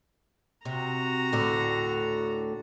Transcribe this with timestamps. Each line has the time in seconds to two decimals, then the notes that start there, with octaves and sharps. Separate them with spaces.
0.65 C3 F#4 A#5
1.32 D2 A2 D3